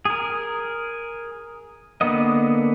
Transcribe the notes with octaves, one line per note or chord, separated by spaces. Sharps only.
G#4 A#4
D3 A#3 B3 D#5